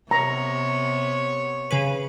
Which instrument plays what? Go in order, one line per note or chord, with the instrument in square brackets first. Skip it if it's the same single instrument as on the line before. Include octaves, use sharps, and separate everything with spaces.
[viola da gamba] C3 B3 [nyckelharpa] C#5 [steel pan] A#5
[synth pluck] C#3 G#4 B4